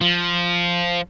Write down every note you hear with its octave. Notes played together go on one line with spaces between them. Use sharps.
F3